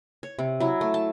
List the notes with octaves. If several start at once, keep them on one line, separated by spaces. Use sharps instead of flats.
C#5
C3
F#3 E4
A3
A5